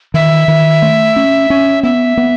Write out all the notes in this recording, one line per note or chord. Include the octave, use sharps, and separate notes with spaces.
D#3 E5
D#3
A3
C#4
C#4
B3 E5
B3